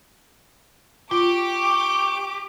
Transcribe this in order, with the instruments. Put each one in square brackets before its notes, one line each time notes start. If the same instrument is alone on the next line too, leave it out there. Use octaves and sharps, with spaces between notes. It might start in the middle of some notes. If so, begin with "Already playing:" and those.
[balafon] F4 [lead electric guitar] G4 [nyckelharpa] C#6 [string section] D6